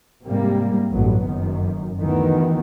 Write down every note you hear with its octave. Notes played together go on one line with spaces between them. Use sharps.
G#2 C3 G3 A#3
A1 G2 F#3 B3
F#1 F#2 D#3
D2 D#3 E3 B3